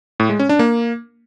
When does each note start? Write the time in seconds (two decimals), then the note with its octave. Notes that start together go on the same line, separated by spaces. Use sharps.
0.20 A2
0.30 G#3
0.39 C#4
0.49 D4
0.59 A#3